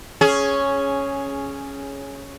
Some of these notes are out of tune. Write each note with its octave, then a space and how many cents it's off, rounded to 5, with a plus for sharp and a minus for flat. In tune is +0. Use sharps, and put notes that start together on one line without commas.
C#4 +0 G#4 +10